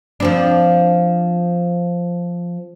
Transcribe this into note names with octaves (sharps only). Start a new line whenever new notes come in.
F3 C4 D4